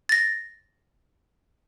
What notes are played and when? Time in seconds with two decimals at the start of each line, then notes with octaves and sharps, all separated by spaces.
0.09 A6 A#6